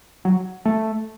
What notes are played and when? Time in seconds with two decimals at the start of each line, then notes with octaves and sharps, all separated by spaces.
0.25 F#3
0.65 A3